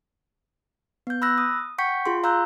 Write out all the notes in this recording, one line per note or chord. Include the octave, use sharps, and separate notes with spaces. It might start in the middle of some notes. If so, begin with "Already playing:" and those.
B3 G6
B5 E6 F#6 A#6
D#6
F#5 G5 C#6 G6 B6 C#7
F4 G#4 C6
F5 A#5 E6 F#6 G6